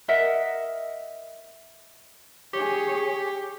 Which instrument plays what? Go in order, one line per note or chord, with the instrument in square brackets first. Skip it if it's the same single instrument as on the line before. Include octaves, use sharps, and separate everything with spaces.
[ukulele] A#4 D#5 E5 F#5
[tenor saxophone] G4 [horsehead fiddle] G#4 C#5